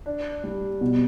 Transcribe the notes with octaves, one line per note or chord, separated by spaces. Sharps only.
D4
G3
B2